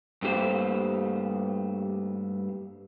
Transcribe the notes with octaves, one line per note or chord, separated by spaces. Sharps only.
G2 A3 A#3 G4 C5